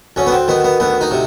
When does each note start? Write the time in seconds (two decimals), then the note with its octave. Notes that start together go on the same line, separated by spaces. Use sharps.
0.16 D2 C#4
0.27 B3
0.32 C4
0.48 D#3 B3
0.64 B3
0.80 D2 B3
1.01 D#4
1.11 C3